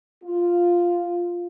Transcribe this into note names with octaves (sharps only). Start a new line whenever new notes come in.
F4